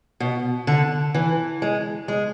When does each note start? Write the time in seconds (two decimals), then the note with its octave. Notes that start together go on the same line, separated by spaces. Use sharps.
0.20 B2
0.67 D3
1.14 E3
1.62 G#3
2.08 G#3